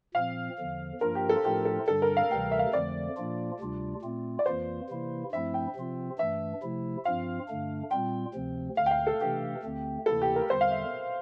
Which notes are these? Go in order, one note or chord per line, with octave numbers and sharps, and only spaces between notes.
A#2 F3 C4 F5
E2 D3 F3
G2 F3 A#3 D4 F4 A#4
G4
A4
A2 F3 A3 D4 F4 G4
A4
G2 D3 G3 D4 A4
A#4
F5
D2 C3 E3 G3 G5
E5
F5
F2 D3 F3 A3 D5
A#2 F3 A#3 D4 F4
D2 C3 G3 D4 F4
A#2 A3 C4 F4
D5
F2 E3 A#3 F4 C5
C3 E3 A#3 E4
G2 F3 A3 C4 E4 E5
G5
C3 F3 C4 F4
G2 E3 A3 D4 E5
C3 F3 A3 E4
G2 F3 C4 F4 F5
G2 D3 A3 D4
A#2 G3 C4 F4 G5
D2 C3 F3 C4
D2 D3 A3 F5
G5
F5
A4
C3 E3 A3 D4 G4
D2 D3 A3 C4
D2 C3 E3 A#3 E4 A4
G4
A#4
E2 D3 G3 C5
F5
E5